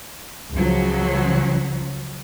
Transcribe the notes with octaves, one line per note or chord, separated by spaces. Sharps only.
C#2 C#3 F3 F#3